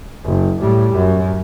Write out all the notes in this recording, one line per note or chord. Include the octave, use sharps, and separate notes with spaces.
F#1
A2 G3
F#2